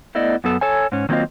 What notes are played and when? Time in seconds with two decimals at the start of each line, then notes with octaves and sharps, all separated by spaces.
0.15 A3 B3 E4 D5 D#5
0.44 F#2 B3 A4
0.61 A4 C#5 G#5
0.92 G#2 C#4
1.09 D#3 F#3 A#3 C4 F4 D#5